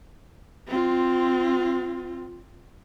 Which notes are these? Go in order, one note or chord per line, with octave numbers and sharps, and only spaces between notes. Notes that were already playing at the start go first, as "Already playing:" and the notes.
C4 F4